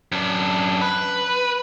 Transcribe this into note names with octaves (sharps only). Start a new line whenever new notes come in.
F#2 D4
B4